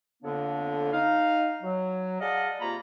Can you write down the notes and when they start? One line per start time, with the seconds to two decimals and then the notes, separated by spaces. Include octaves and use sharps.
0.23 F2 D3 A#3 B3 D4 C#5
0.92 D#4 F5
1.62 F#3
2.21 G#4 D5 D#5 F5 F#5 A5
2.60 C3 A#3 F4 A#5 B5